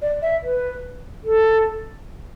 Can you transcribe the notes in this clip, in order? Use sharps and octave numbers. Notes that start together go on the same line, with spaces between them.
D5
E5
B4
A4